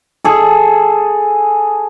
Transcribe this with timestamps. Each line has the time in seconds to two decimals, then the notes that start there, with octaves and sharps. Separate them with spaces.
0.25 G#4 A4